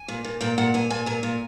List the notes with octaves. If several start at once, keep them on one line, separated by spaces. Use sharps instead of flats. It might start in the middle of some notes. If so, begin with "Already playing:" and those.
Already playing: G#5
A#2
A#2
A#2 G5
A#2 F#5
A#2 G#5
A#2 G#5
A#2 G#5
A#2